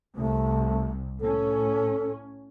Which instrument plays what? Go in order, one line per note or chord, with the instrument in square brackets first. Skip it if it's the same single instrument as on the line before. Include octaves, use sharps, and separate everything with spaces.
[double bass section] C2 C3 [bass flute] A3
[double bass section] A2 C#4 [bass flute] A4